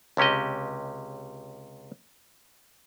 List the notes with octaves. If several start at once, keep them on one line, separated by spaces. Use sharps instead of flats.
C#2 C3 C#4 G4 D#5